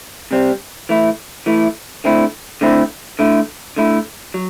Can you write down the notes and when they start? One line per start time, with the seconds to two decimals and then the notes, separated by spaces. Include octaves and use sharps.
0.31 C3 G3 C4
0.89 E3 A3 E4
1.46 E3 A3 E4
2.04 D3 A3 C4 E4
2.61 D3 A3 C4 E4
3.19 D3 A3 E4
3.76 D3 A3 E4
4.34 F#3